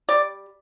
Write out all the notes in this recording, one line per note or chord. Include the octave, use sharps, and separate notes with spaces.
G3 D5